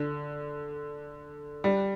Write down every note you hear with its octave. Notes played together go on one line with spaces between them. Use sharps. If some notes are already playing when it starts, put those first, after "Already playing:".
Already playing: D3
G3